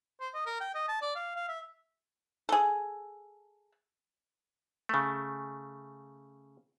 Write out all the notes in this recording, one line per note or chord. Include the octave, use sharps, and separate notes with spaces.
C5
D#5
A#4
G5
D#5
A5
D5
F5
F5
E5
G#4 A4
C#3 A3